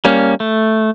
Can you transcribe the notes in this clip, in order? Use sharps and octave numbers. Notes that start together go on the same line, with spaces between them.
G3 A#3 C#4
A3